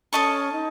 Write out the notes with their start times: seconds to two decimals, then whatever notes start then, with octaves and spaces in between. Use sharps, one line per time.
0.13 C#4 A4 D#5 A5 C#6
0.52 D#4